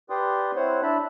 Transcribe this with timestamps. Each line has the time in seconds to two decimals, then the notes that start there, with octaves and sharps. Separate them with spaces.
0.10 G4 B4 D5 G5 C6 D#6
0.56 C4 E4 C5 C#5 F#5
0.83 D4 E4 E5 A5 B5